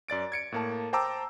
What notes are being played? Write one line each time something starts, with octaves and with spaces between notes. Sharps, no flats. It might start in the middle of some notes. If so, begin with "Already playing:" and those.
F#2 D5 A6 D7
G#6 C#7 D7
A2 A#3 A5
C5 G5 A5 A#5 D6 E6